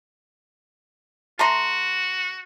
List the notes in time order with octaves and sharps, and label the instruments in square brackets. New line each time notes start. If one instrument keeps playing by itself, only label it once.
[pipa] A3 A#5 C6 [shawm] F#4